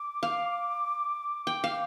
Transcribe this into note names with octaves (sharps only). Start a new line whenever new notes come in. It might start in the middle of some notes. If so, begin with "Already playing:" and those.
Already playing: D6
F5
G5
F5